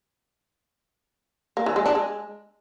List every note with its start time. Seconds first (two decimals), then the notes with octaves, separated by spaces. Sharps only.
1.57 A#3
1.66 E3
1.76 G#3
1.86 D4
1.95 G#3